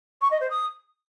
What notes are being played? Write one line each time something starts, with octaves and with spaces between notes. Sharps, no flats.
C#6
D#5
C5
D#6